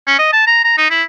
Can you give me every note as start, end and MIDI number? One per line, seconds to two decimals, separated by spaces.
0.07 0.14 61
0.19 0.29 75
0.32 0.46 81
0.47 0.60 82
0.64 0.76 82
0.78 0.87 63
0.90 1.03 64